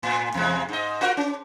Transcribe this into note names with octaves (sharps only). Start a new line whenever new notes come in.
A2
E2 C3 G#3
G#2 D#5
F4 F#4 A#4
C#4